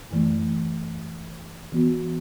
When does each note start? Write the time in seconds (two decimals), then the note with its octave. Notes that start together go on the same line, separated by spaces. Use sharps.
0.11 F#2 E3 A3
1.72 E3 B3 F#4